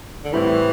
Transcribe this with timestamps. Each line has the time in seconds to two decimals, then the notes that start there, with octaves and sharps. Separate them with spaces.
0.24 D3
0.33 A2 E3 G3 C4 E4